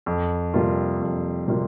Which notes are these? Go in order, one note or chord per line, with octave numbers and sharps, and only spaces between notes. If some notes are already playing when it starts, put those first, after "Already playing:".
F2
C3 G3 A#3 F4
F2
C3 G3 A#3 F4